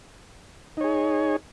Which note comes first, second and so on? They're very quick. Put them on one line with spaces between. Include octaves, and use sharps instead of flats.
D#4 C#5 G#4